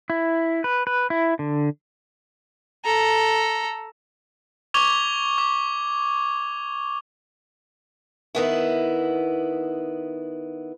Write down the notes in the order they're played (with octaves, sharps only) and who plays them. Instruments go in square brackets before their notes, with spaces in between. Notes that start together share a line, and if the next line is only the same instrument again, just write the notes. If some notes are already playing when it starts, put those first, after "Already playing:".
[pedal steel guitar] E4
B4
B4
E4
D3
[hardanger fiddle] A4 A#5
[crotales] C#6 D6 G#6 F7 G7
D6
[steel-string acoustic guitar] D#3 B3 E4